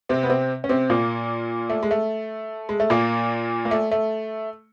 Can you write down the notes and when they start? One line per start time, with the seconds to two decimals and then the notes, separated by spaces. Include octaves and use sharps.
0.09 C3 C4
0.23 B3
0.29 C3 C4
0.64 C#4
0.69 C3 C4
0.90 A#2 A#3
1.70 A3
1.83 G#3
1.91 A3
2.69 G#3
2.80 A3
2.90 A#2 A#3
3.65 A#3
3.71 A3
3.91 A3